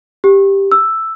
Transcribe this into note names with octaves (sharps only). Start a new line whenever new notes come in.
G4
E6